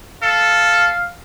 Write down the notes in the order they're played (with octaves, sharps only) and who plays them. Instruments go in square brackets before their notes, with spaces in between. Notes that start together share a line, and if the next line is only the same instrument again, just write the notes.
[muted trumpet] A4 [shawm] F5